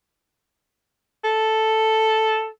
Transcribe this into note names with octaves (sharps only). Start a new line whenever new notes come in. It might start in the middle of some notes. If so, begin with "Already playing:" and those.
A4